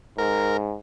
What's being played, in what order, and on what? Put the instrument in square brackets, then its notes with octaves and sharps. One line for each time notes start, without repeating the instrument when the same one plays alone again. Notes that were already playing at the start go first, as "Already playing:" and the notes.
[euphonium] G#2 [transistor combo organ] A#4